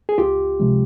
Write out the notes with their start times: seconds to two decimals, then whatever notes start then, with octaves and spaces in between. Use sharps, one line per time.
0.09 G#4
0.18 C#2 F4 G4
0.60 C3 F3 G#3